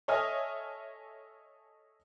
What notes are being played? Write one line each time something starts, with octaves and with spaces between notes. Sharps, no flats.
A4 C#5 D#5 E5 G#5 F6